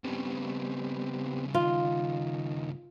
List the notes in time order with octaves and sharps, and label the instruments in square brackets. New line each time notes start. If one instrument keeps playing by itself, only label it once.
[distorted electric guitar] G2 C#3 [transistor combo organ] G3 B3 C4
[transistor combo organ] D#3 [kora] F4